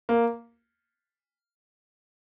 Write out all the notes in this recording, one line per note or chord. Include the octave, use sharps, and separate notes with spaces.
A#3